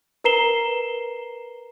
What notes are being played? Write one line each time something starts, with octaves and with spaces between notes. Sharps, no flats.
A#4 B4 A#5 C7 E7 G7